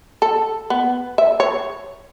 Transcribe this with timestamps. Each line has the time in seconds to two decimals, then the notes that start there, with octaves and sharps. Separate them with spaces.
0.22 A4
0.70 B3
1.18 E5
1.40 C#5